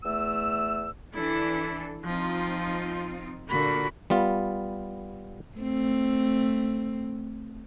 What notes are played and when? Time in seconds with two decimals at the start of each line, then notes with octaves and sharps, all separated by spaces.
0.03 E2 A3 E6
1.14 E3 D4 E4 A4
2.04 F3 C4 D#4 F4
3.50 A#2 D3 A#3 F#4 B5
4.10 G3 B3 F4
5.58 A3 C4